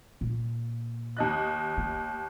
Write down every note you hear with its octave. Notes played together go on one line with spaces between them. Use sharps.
A#2
D#2 D#5 F#6
A#3